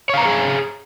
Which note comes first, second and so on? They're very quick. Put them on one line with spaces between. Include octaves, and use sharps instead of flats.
C#5 F5 A#5 B4 G#4